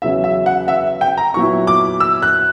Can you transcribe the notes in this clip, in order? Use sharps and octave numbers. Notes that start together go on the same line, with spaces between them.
E2 C#3 F#3 C#4 E5
E5
F#5
E5
G5
A#5
A#2 F#3 B3 E4 C#6
D6
E6
F#6